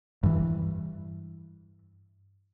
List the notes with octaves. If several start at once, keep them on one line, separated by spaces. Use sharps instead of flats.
G2 E3